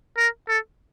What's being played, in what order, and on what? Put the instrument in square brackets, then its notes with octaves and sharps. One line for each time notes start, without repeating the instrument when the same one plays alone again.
[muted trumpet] A#4
A4